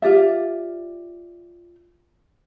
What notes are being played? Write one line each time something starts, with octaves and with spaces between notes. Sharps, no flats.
F4 G4 D5 E5